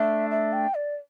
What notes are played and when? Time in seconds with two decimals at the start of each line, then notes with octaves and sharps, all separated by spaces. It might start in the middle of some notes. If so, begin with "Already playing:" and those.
Already playing: A3 D4 E5
0.31 E5
0.53 G5
0.75 D5